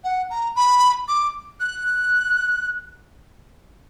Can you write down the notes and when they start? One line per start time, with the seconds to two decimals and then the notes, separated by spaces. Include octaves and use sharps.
0.04 F#5
0.30 A#5
0.56 B5
1.08 D6
1.60 F#6